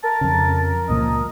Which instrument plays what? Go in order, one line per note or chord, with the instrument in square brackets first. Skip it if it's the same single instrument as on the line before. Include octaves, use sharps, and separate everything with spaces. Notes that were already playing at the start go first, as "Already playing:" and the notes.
[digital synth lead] A#4 [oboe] A5
[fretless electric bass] F2 C#3
[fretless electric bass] C#2 A#2 F3 [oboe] D#5